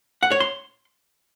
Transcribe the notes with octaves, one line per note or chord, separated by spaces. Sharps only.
F#5
C#5
C6